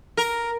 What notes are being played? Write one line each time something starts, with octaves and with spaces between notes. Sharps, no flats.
A#4